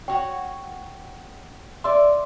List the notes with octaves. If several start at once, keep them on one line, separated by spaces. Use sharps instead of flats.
F#4 C#5 G5
D5 E5 C6